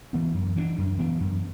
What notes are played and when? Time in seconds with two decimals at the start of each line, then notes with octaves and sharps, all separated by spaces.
0.13 E3 B3 D4
0.34 F#2
0.56 E3 B3 D4
0.78 F#2
0.99 E3 B3 D4
1.20 F#2